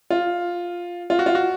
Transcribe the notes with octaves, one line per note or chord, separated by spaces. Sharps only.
F4
F4
F#4
F4
F#4